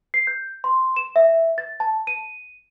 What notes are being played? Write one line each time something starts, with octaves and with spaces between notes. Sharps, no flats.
C7
G6
C6
E7
E5
A6
A5
D#7